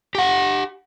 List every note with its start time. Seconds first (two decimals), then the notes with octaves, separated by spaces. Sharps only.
0.15 G4 F#5